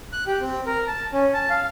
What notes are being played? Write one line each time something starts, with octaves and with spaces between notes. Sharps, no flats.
F#6
G4
C4
A#4
A5
C#4
A5
F5